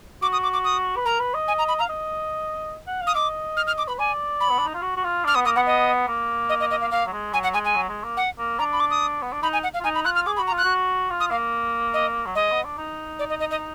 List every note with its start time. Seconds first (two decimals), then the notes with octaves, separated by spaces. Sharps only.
0.22 F#4 D6
0.33 D#6
0.43 D6
0.53 D6
0.64 D#6
0.96 B4
1.05 A#4 A#5
1.20 B4
1.34 D#5
1.48 G#5
1.58 A#5
1.68 B5
1.79 F5 A#5
1.89 D#5
2.87 F#5
3.01 F5
3.07 D#6
3.15 D#5 D6
3.57 F6
3.67 F6
3.78 D6
3.88 B4 B5
3.99 D5 G#5
4.41 B5
4.50 B3
4.58 D4
4.66 D#4
4.74 F4
4.82 F#4
4.96 F#4
5.03 F4
5.24 D4 F6
5.35 B3 D#6
5.45 A#3 D#6
5.56 B3 F#5
5.66 D#5
6.07 A#3
6.49 D#5
6.60 D#5
6.71 D#5
6.81 F5
6.91 A#3 F5
7.06 F#3
7.12 G#3
7.33 F#3 G#5
7.43 F#5
7.54 G#3 G#5
7.65 G#5
7.76 F#3
7.89 G#3
8.04 A#3
8.17 F#5
8.38 A#3
8.59 D4 A#5
8.73 B5
8.80 D6
8.90 D#6
9.22 B3
9.32 D4
9.42 D#4 B5
9.53 G#5
9.63 F#5
9.74 F5
9.80 F4
9.84 D#4 G#5
9.95 B5
10.05 F4 F#6
10.15 F6
10.26 G#4 D6
10.37 B5
10.39 F#4
10.47 A#5
10.51 F4
10.58 F#6
10.64 F#4
11.10 F4
11.20 D#6
11.31 A#3 F5
11.94 D#5
12.26 F#3
12.35 G#3 D#5
12.51 B3
12.65 D4
12.78 D#4
13.19 D5
13.30 D#5
13.40 D#5
13.51 D#5